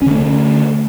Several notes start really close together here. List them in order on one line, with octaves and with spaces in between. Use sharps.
C#4 D3 A3